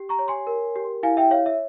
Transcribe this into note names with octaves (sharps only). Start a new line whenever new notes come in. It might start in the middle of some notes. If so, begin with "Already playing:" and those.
Already playing: G4
A#5 C#6
C#5
G#5 C6
A#4
G4
E4 F5 G#5
E5 G5
C#5 F5
E5